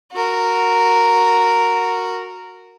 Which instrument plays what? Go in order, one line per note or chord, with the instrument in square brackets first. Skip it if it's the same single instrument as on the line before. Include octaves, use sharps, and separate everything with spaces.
[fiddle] F#4 A#4